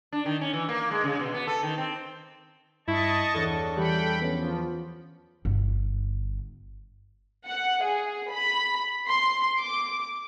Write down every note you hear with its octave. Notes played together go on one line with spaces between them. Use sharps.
D4
D#3
C#4
E3
A#3
G#3
C#3
B2
B3
A4
D#3
C4
G2 E4 D#5 A5 C#6
E2 D4 A4 C#5 D#6
E3 G3 G5 B5 C#7
F3 B3 C#4
G1
F#5
G#4
B5
C6
D6